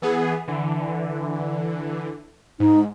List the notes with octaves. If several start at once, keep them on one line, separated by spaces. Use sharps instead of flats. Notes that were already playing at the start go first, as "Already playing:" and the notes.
E3 B3 G#4
D3 E3
G#2 D#4